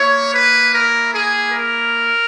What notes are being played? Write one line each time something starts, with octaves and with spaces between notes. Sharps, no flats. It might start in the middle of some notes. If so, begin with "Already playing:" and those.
Already playing: A#3 E4 C#5
B4
A#4
G#4
A#4